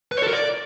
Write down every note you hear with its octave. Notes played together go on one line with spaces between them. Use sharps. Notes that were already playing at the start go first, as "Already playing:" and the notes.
B4
C#5
A4
A#4
D5